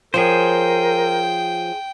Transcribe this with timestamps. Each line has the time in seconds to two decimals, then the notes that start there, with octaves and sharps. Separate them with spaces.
0.14 F3 G#4 A#4 C5 C#5 G5